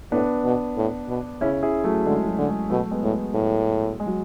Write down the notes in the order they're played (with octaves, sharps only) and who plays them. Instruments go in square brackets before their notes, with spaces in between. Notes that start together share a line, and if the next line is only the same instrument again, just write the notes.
[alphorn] A2 [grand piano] B3 D4
[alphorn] B2
A2
B2
[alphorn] C#3 [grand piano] C#4 E4
[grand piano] E4 G#4
F#3 A3
[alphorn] D3 [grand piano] G#3
[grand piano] F#3
[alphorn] D3
[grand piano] G#3
[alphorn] B2 [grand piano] F#3 A3
[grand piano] G#3 B3
[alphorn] A2
A2
[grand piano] G#3
F#3